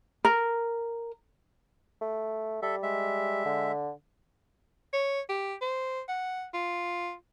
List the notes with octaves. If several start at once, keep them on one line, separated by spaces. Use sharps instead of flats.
A#4
A3
G3 A4 E5
G#3 E5
D3
C#5
G4
C5
F#5
F4